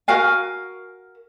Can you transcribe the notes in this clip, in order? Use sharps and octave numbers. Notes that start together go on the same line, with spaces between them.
F#4 A#4 F5 G#5